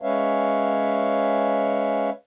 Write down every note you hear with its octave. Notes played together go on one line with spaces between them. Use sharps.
G#3 C#4 B4 C#5 E5 F5